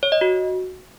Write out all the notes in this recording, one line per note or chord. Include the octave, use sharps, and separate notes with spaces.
C#5
D#5
F#4